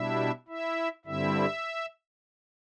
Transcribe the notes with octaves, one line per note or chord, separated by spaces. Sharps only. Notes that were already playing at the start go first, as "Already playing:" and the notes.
Already playing: B2 G3 D4 E4 E5
E4 E5
G2 D3 G3 C4 E4 E5